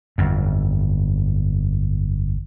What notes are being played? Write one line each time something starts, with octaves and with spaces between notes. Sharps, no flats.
G1 F2